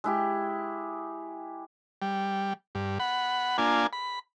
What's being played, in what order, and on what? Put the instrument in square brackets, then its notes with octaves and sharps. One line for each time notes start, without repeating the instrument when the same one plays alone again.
[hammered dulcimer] G#3 E4 G4
[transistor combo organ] G3
G2
F#5 B5
A#3 D4 F4 G#5
B5